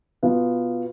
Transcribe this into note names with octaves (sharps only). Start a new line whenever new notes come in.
B2 B3 F4